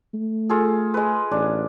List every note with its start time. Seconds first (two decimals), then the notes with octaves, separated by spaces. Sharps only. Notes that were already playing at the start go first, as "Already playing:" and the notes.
0.14 A3
0.49 F4 G#4 A4
0.94 G#3 B4
1.31 A1 D4